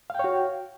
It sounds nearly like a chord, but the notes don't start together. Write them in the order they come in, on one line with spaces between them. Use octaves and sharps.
F5 G5 C#5 F#4